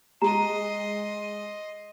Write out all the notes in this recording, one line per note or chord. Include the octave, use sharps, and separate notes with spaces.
G#3 D#5 A#5 C6